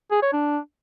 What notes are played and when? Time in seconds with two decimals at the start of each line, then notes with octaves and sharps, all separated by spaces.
0.11 G#4
0.22 C#5
0.33 D4